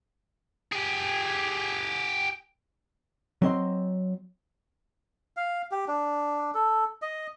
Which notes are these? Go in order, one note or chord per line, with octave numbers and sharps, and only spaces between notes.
G4 G#4
F#3 C4 D#5 C6
F5
G4
D4
A4
D#5